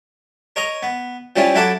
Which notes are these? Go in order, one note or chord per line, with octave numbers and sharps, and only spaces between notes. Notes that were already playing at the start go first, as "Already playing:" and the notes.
A#4 C#5 D#5 A#5
B3
F3 G3 C4 C#4 E4 F4
F#3 E4 A4 F#5 A5 D6